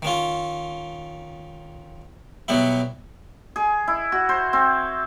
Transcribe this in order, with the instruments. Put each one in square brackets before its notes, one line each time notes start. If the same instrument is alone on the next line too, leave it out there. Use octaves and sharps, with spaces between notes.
[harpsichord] D#3 C#4 F4
B2 F#3 G3 B3 E4
[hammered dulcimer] G#4
E4
F#4
C5
C4